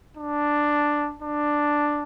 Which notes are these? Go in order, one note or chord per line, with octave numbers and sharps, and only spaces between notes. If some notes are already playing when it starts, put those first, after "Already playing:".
D4
D4